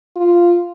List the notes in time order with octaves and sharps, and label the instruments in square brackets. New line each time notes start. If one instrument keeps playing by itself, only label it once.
[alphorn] F4